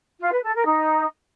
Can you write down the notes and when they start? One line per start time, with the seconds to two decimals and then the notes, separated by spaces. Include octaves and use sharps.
0.20 F4
0.32 B4
0.43 A4
0.55 A#4
0.66 D#4